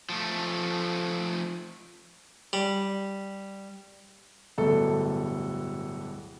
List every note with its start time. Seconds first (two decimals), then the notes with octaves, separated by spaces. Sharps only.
0.09 F3 A3
2.53 G3
4.58 D1 G2 B2 A3 A4